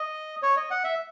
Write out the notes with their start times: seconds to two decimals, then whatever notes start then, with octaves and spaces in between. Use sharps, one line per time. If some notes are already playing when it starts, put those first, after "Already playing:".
Already playing: D#5
0.43 C#5
0.57 D#5
0.70 F#5
0.84 E5